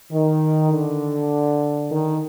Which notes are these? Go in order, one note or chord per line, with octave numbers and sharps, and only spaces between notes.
D#3
D3
D#3